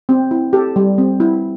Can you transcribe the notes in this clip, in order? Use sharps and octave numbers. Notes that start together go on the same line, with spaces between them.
C4
E4
G4 A4
G3
C4
E4